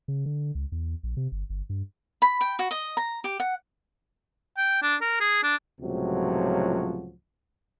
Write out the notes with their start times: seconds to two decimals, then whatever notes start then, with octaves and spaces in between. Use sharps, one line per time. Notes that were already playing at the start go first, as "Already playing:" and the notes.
0.08 C#3
0.26 D3
0.55 C#2
0.72 E2
1.03 A#1
1.17 C3
1.32 G1
1.50 G1
1.69 G2
2.22 B5
2.41 G5
2.59 F#4
2.71 D#5
2.97 A#5
3.24 G4
3.40 F#5
4.58 G5
4.82 D4
5.01 A#4
5.20 G#4
5.43 D4
5.81 C#2 A2 C3 F3 F#3 F#4